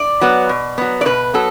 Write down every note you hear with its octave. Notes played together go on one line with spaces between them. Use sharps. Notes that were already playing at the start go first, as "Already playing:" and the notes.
Already playing: D5
F#3 B3
B2
F#3 B3
D5
B2 B4
F#3 B3 A4